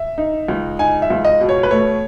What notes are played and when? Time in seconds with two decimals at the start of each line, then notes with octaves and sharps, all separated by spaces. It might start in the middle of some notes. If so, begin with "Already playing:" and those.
Already playing: E5
0.18 D#4
0.48 C#2
0.79 D#4 G#5
1.02 E5
1.10 C#2
1.25 D#5
1.40 B2
1.49 C#5
1.63 B4
1.71 A3 C#5